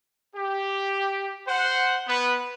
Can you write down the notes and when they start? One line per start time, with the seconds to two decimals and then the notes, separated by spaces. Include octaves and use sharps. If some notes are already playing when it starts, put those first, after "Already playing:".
0.36 G4
1.48 C5 F#5
2.08 B3 B4